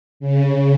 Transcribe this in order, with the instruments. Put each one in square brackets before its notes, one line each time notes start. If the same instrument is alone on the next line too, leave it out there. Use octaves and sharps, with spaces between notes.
[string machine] C#3